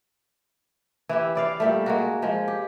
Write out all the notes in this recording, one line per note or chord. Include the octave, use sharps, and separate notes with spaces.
E3 E4 G4
E4 D5 F5
A#2 G3 A3
G#3 A#3 F#4
F3 G#3
G4